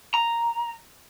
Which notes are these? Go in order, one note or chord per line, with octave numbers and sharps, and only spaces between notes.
A#5